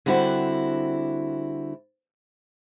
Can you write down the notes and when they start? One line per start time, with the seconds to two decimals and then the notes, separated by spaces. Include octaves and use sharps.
0.06 D3 G3 C4 E4 F#4